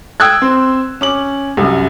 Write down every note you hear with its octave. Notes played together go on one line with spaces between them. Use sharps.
G5 D#6 E6 F#6 G#6
C4 C5
C#4 D6 F#7
C2 F#2